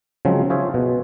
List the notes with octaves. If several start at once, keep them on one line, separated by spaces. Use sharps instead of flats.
C#3 F3 F#3 G#3 C4
F4 G#4 C5 C#5 E5
B2